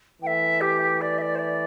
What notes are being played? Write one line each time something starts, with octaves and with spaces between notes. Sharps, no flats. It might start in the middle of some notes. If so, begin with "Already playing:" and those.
E3 A3 E5 G5
G4
D5
E5
D5
C5
D5